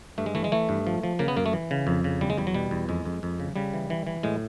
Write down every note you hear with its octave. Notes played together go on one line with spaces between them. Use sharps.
G2 A3
G#3
E3 A3
G#3
E3 A3
G2
F3
F3
C#3 A#3
B3
F#2 A#3
A3
E3
C#3
F2
C#3
E2 G3
G#3
E2 G3
F#3
B2 G3
E2
F2 G#3
F2
F2
C#3
C#3 G3
E3
E3
E3
A2 G#3